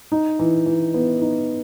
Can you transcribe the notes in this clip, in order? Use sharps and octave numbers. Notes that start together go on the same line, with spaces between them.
D#4
E3
E3
B3
D#4